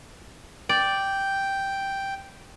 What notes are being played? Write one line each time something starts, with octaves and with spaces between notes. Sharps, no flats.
D5 G5